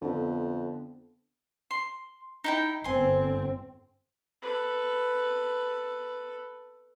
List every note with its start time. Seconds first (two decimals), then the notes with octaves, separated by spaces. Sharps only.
0.02 F2 D3 B3 C4
1.71 C6
2.44 D#4 E4 G5
2.84 G1 C4 G#5 C6
4.42 A4 B4